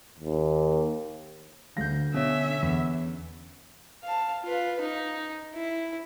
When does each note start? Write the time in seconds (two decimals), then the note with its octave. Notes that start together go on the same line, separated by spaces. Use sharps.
0.19 D#2
1.77 D2 D3 F5 G6 A#6
2.14 B2 C#4 C#5 E5
2.62 E2
4.03 F5 A5
4.44 F4 B4
4.81 D#4
5.54 E4